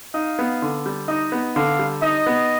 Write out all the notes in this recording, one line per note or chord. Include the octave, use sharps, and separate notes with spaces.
D#4 F5
B3
D3
G3
D#4 D#5
B3
D3 F5
G3
D#4 D#5
B3